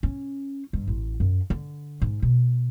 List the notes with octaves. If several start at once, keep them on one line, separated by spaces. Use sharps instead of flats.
C#4
G2
A1
F#2
D3
G#2
B2